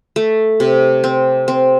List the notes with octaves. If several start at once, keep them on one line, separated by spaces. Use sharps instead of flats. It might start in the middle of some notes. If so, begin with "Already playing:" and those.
A3
C3
C4
C4